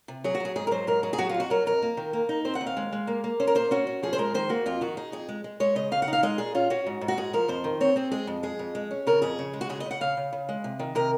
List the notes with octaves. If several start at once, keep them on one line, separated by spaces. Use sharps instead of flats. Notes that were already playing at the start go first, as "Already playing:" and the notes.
C3
F#3 G#4
F#4
F#3 G#4
G#2 G#4
A#4
F#3 C5
G#2 A#4
F#3 G#4
G#4
F#3 F#4
F4
F2
F#4
F#3 A#4
F2 A#4
A#3
D#3
A#3
D#4
C4 C5
F#5
D#2
F5
G#3
G#3
A#3
A#3
C#4 C5
A#4
A#3 C5
C#4 F#4
C#4
F3 G#4
C5
G#3 A#4
D#3 C5
A#3 F#4
F2 F4
D#3 F#4
D#4 G#4
F2 G#4
G#3
G#3
G#3 C#5
C#3 D#5
C#3 F5
F#5
D#4
F5
G#3 D#5
A#2 G#4
C#4 F4
C#4 F#4
G#2
G#2
F#4
G#2 G#4
F3 A#4
F2 C5
D#3
C4 C#5
C4 G#4
G#3 G#4
F2
G#3 G#4
F2
G#3
C#4
C#3 A#4
F2 G#4
C#3
G#3
F#4
C#3 G#4
D#5
C#3
F#5
C#3 F5
C#3
C#3
G#3
C3
D#3
C3 A#4